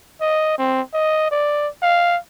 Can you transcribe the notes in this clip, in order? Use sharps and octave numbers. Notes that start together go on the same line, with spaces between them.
D#5
C4
D#5
D5
F5